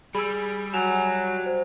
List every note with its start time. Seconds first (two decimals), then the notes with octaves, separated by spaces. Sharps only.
0.15 G3 G#4 B5 E6
0.73 F#3 G#5 E7 F7
1.46 C5